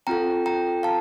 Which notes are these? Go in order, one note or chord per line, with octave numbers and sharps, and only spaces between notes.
C4 F4 A4 G5 A#5
G5 A#5
F5 A5